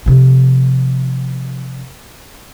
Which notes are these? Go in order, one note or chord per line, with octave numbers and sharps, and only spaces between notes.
C3 F3